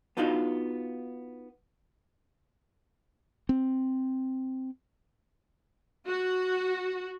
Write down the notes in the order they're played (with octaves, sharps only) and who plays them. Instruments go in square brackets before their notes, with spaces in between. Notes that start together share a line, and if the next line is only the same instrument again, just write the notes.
[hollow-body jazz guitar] B3 D4 D#4 F4 F#4 D#5
[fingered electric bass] C4
[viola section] F#4